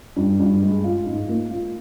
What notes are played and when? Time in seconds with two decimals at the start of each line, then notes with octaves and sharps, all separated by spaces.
0.16 G2
0.40 G2
0.62 G#3
0.84 F4
1.06 G#2
1.29 A#3
1.51 F4